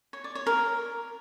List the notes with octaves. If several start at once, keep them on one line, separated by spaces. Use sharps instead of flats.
C#5
D5
C#5
A#4